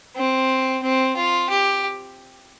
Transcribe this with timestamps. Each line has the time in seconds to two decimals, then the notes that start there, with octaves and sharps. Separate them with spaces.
0.16 C4
0.83 C4
1.16 F4
1.50 G4